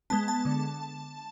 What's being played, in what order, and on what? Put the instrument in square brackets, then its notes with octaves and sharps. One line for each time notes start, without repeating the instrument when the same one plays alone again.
[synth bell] G#3 B3 A5
A5
D3